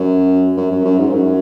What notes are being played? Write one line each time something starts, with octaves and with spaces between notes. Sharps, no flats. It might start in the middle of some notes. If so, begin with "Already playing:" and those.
Already playing: F#2
F#2
F#2
F#2
G#2
F#2